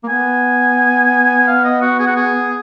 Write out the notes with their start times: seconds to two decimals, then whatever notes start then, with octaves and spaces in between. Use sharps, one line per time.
0.04 A#3
0.09 B3 G#5
1.48 F5
1.65 D#5
1.82 F#4
1.99 G#4
2.07 F#4
2.16 G#4